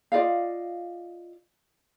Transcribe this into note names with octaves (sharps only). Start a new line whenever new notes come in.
F4 D5 D#5 F5